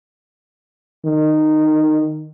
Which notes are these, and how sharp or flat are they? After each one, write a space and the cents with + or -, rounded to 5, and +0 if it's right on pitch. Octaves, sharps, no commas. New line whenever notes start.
D#3 -15